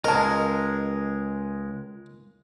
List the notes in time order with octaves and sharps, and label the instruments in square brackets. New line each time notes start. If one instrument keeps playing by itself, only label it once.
[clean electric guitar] C#2 G#3 [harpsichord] A#4 [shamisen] D#5 A5